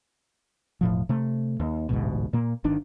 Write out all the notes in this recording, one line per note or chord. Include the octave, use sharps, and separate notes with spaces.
E1 A2 F3
C3 A3
D#2
A1 D2 G#2 B2
A#2 A#3
G1 D#3 D4